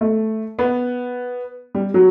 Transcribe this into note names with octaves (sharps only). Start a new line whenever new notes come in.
A3
B3
G3
F#3